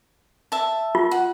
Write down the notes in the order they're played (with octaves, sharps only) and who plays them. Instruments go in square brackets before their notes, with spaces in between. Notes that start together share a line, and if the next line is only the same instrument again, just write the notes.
[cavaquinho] E5 A5
[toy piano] F4
[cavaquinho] F#5